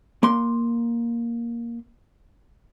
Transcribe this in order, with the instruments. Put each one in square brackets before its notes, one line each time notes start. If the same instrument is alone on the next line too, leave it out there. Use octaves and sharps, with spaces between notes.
[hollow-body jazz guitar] A#3 C6